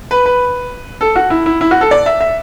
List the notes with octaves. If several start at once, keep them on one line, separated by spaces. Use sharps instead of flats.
B4
B4
A4
F#4
E4
E4
E4
F#4
A4
D5
E5
E5